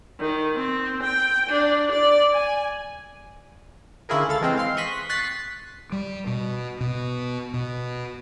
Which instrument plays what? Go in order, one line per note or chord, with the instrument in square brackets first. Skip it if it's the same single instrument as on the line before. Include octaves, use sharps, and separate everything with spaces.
[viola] D#3
C4
G5
D4
D5
G#5
[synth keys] D3 C#4 E4 F4 G#4 A#4
C#2 A4 F5 A6
E3 G#3 C4
F5 C6
C6 C#6 D#6 F#6 A#6 B6
C#6 F#6 A6 B6 C7
[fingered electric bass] G3
B2
B2
B2